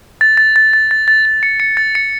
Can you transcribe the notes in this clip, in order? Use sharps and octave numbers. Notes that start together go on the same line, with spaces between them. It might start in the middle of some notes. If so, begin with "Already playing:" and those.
A6
A6
A6
A6
A6
A6
A6
C#7
C#7
A6
C#7